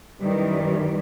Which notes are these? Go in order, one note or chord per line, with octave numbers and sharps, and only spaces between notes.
F#2 D#3 E3 G3